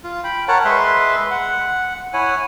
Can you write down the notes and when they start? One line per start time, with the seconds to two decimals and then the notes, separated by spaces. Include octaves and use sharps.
0.04 F4
0.24 G5 B5
0.48 A#4 C#5 F#5 A5
0.65 G#3 B4 E5 C6
1.31 F#5
2.13 E4 C#5 F#5 G#5